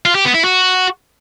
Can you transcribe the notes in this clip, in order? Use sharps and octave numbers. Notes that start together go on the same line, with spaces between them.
F4
G4
B3
E4
F#4